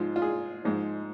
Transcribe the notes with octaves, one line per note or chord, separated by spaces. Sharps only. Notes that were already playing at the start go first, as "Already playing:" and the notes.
Already playing: G#2 F3 G#3 F4
F4
G#4
G#2 F3 G#3